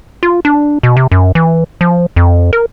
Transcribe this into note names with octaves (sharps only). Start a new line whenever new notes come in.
F4
D4
B2
C3
F#2
E3
F3
F2
A#4